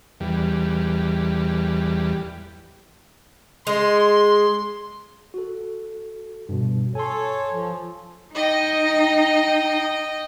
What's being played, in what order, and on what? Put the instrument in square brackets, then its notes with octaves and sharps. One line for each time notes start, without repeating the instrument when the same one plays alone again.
[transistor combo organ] E2 G3
[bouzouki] G#3 [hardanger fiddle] C6
[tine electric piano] F#4 A4
G2 B2
[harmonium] A4 C#5 [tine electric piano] G#5 C6
[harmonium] F3
[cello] D#4 [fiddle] D#5 G5